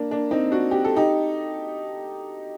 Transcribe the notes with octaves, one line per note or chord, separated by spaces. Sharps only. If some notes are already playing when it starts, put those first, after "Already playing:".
Already playing: A#3 D4
A#3 D4
C4 D#4
D4 F#4
G4
A4
D#4 G4